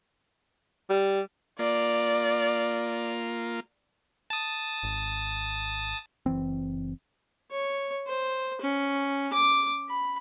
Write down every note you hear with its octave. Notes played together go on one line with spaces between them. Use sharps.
G3
A#3 F4 D5
A5 D#6
G#1
F#1 E3 C4
C#5
C5
C#4
D6
B5